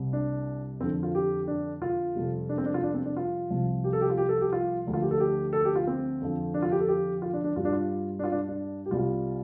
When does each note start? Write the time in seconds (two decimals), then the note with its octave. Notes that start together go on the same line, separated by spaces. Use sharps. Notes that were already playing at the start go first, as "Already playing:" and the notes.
Already playing: C2 C3 G3
0.13 D4
0.80 F2 D3 F3 C4
1.03 F4
1.15 G4
1.47 D4
1.82 F4
2.16 F2 C3 G3
2.49 D4
2.58 C4
2.66 D4
2.74 F4
2.83 D4
2.94 C4
3.06 D4
3.17 F4
3.50 C2 C3 F3
3.84 G4
3.93 A4
4.01 G4
4.10 F4
4.18 G4
4.29 A4
4.41 G4
4.53 F4
4.86 D2 D3 F3
4.94 F4
5.02 G4
5.11 A4
5.20 G4
5.53 A4
5.65 G4
5.76 F4
5.87 C4
6.21 F2 D3 F3
6.54 D4
6.62 F4
6.72 G4
6.80 A4
6.88 G4
7.22 F4
7.34 D4
7.44 D4
7.56 G2 G3 F4
7.65 D4
7.73 F4
8.19 D4
8.24 F4
8.32 D4
8.49 D4
8.86 G4
8.91 C2 C3 G3 F4